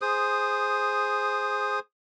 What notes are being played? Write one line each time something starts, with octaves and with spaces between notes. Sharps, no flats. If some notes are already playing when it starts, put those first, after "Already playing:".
G#4 C5 D#6